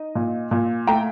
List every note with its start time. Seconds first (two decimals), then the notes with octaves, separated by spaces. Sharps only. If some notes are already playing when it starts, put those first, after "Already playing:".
Already playing: D#4 D#5
0.15 A#2
0.51 A#2
0.87 A3 G5 A#5